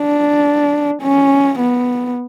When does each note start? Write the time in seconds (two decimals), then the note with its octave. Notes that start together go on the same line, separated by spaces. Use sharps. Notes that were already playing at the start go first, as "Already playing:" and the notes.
Already playing: D4
1.02 C#4
1.59 B3